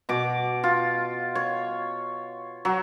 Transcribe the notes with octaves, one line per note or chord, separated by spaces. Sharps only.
B2 D6
F4
C#5
F#3